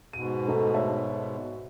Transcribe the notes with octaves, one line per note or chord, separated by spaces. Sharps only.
G#2 B2 D#7
A3 D#4 A4
C#5 E5 A5